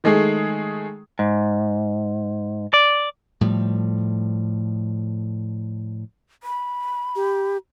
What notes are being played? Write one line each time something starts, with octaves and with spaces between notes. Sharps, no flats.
D#3 G#3 A3 G#4
G#2
D5
A2 F3 G3
B5
G4